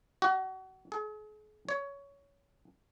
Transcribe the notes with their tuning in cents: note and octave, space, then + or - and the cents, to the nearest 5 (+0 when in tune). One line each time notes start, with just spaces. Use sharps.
F#4 +30
G#4 +45
C#5 +15